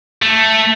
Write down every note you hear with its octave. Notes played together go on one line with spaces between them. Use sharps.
A3